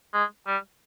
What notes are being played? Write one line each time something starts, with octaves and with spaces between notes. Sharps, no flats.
G#3
G3